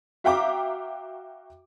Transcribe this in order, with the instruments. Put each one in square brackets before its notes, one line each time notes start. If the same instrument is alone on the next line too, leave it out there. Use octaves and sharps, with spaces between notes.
[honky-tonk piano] F#4 E5 F5 G5 A#5 D6